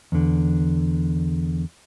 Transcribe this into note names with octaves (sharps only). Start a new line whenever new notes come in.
E2 D3